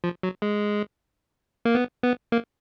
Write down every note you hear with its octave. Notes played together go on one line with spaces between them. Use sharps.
F3
F#3
G#3
A#3
B3
B3
A#3